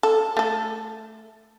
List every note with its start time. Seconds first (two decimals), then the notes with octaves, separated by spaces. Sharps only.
0.03 A4
0.37 A3 A4